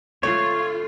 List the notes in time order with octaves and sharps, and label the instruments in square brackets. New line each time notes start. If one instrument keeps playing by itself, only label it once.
[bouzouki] D3 A3 C4 [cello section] F4 [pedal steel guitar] C#5